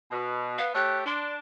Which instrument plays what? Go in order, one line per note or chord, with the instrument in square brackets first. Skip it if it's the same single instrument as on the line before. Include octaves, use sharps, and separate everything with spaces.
[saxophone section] B2
[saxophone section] B3 [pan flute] F5
[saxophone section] A3 G4 C#5 [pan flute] F#6
[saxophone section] D4 [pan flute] C6